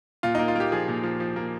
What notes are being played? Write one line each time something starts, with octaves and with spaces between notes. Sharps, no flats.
A#2 F4
D#4
A#3
F4
A#3 G4
F3 G#4
A#2
F3
F3
A#3